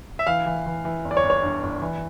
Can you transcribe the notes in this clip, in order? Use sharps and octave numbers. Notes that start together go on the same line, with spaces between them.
E5
E3 F5
E3
E3
E3
G1
D5
C#5
G1
C#5
G2
G1
E3